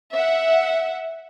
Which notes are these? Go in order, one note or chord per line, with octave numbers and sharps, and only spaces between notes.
E5 F#5